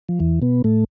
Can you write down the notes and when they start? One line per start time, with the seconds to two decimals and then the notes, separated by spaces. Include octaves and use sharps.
0.09 F3
0.19 E2 E3
0.42 B2 B3
0.64 A2 A3